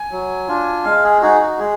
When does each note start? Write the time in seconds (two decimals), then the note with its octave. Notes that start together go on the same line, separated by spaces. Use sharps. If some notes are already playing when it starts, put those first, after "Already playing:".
Already playing: G#5
0.11 F#3
0.48 D4 F4
0.85 G#3 F5
1.04 G#4
1.22 D#4 F#4 G#4
1.41 F#4
1.59 G#3 G#4